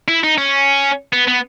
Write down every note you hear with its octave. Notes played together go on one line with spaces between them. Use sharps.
E4
D#4
C#4
B3
B3